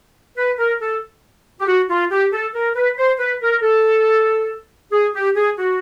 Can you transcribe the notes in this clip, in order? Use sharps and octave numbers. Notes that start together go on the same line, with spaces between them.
B4
A#4
A4
G4
F#4
F4
G4
A4
A#4
B4
C5
B4
A#4
A4
G#4
G4
G#4
F#4